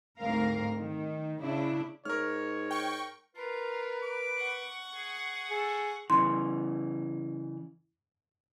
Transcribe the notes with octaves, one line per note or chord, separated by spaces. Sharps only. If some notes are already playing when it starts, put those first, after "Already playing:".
D2 G#2 C4 A#4 F5
D#3
C#3 D4 E4
G#2 A#4 C#5 F6
G5 C#6
F4 A#4 B4
D6
F#5 C#6
G#4
G#4 A4
C#3 E3 C6